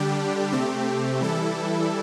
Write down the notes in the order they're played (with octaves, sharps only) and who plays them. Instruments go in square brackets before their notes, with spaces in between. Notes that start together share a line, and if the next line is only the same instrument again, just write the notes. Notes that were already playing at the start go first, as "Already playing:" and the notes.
Already playing: [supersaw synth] D3 G3 D4 G4
C3 A3 C4 G4
E3 G3 E4 A4